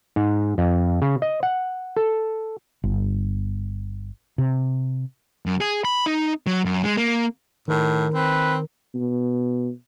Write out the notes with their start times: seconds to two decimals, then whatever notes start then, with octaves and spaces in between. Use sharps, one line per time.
0.16 G#2
0.58 F2
1.02 C#3
1.22 D#5
1.43 F#5
1.96 A4
2.84 G1
4.38 C3
5.46 F#2
5.61 G#4
5.85 B5
6.06 D#4
6.47 F#3
6.65 F#2
6.84 G#3
6.97 A#3
7.68 A2 D#3 A#4
8.14 C4 B4
8.94 B2